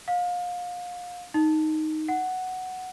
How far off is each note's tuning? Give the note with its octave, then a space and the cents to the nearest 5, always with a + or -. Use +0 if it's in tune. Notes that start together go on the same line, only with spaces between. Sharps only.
F5 +30
D#4 +0
F#5 +0